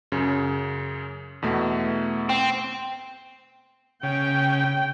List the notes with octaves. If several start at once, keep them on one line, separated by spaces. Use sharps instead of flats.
F#2 C#3
E2 B2 A3
C4
C#3 G5